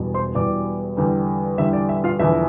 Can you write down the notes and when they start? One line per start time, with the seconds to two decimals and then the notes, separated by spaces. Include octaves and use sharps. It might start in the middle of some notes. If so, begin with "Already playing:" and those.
Already playing: E1 E2 B2 G3
0.14 C5 C6
0.35 E1 E2 B2 G3 D5 D6
0.97 E2 D3 G3
1.58 E2 D3 G3 E5
1.73 D5
1.89 E5
2.04 F4 F5
2.19 E1 E2 D3 F3 E5